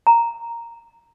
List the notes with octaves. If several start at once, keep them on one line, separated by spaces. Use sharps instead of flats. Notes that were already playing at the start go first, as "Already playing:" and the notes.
A#5